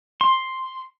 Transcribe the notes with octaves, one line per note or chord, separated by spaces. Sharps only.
C6